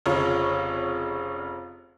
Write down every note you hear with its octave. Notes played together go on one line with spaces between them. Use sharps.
F1 C#3 F4 C#5